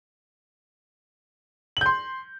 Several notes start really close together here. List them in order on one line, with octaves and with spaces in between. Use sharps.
F#7 G6 C6